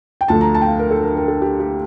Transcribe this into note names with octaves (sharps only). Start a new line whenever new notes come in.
G5
D2 D3 F3 A3 A5
A#5
A5
G5
F5
A#4
A4
A#4
A#4
A4
G4
G4